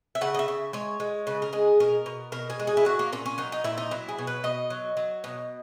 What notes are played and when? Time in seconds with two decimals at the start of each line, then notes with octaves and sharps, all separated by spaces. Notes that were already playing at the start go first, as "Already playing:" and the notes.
0.15 E5
0.21 C#3 F#5
0.34 D#5
0.39 E5
0.48 C#3
0.73 G#3 C#5
1.00 G#3
1.27 C#3 B4
1.42 A#4
1.53 G#3 G#4
1.80 B2 A#4
2.06 B2
2.32 B2 A#4
2.50 G#4
2.60 G#3
2.67 G#4
2.77 E4
2.85 F#3 F#4
2.99 A#3
3.13 A#2 C#4
3.26 C#4
3.38 F#3 D#4
3.52 D#4
3.64 A#2 E4
3.78 D#4
3.91 F#3 E4
4.09 G#4
4.18 B2
4.27 B4
4.44 B2 D#5
4.70 F#3
4.97 F#3
5.24 B2